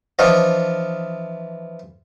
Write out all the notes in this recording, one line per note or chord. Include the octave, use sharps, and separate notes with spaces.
E3 F3 D4 F4 C#5 D#5